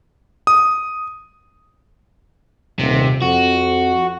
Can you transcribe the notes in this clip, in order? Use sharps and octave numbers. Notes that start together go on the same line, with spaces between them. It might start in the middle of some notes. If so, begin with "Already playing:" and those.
D#6
D#1 C3
F2 F#4